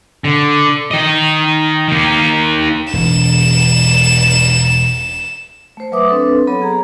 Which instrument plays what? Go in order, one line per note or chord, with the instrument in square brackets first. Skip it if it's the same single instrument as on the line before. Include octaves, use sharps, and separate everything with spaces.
[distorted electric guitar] D3
D#3 D#5
D#3 A#3
[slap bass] E1 [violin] E7
[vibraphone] A3 C5
F#3 B4 E5 D6 D#6
C4 D4 A4 B4
F#3 B3 A4 C#5 B5
G#4 A#5